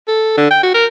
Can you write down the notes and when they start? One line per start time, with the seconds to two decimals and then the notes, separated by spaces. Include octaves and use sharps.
0.07 A4
0.37 D3
0.50 G5
0.63 F#4
0.74 A#4